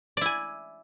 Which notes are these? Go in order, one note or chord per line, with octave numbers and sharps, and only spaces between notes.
E4 D5 G#5